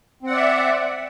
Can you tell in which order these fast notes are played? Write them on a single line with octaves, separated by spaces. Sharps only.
C4 F#5 D5 E5